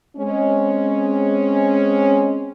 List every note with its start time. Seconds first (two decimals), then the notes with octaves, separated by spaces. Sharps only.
0.17 G#3 C4 C#4